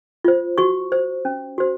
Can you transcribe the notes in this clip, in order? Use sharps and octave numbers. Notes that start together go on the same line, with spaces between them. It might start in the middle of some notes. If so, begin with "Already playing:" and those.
F4 C5
F#4 C#6
C5
C#4
F#4 C5